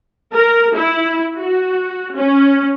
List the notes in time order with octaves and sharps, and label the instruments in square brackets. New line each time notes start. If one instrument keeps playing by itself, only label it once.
[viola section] A#4
E4
F#4
C#4